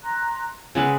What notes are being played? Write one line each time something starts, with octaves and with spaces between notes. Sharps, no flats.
A#5 C6 F#6
C#3 G#3 B4 F#5 E6